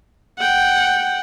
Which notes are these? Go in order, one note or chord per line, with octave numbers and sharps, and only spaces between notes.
F#5 G5